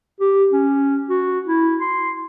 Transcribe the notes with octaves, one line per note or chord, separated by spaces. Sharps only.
G4
C#4
F#4
E4
C6